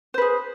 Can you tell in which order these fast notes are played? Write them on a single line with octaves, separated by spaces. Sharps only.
C5 B4 G#4